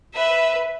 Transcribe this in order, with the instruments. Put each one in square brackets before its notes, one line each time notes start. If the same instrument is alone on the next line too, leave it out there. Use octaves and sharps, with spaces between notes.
[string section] B4 [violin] E5